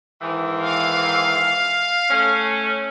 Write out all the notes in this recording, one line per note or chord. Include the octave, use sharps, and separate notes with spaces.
G#2 D#3 E3
F5
A3 C#4